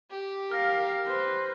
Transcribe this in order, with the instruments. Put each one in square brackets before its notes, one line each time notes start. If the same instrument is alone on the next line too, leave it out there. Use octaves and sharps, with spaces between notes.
[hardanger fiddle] G4
[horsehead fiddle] A#4 F5 [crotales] F6 A#6
[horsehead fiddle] B4 C5